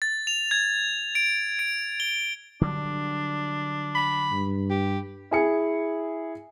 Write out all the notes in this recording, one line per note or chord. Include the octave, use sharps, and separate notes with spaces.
A6
F7
G#6
D7
D7
G7
D3 F#3 G3 D4
B5
G2
G4
E4 G#4 C#7